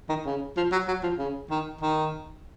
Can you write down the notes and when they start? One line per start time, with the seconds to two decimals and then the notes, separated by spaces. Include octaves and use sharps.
0.09 D#3
0.25 C#3
0.56 F3
0.72 F#3
0.88 F#3
1.03 F3
1.18 C#3
1.50 D#3
1.81 D#3